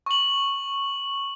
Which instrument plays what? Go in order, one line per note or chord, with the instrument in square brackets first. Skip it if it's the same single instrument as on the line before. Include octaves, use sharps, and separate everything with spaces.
[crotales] C#6 F#7